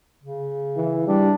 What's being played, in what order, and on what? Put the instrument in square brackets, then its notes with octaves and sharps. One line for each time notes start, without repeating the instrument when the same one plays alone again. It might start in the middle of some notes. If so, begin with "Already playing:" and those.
[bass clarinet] C#3
[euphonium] E3
[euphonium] G3 [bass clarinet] D4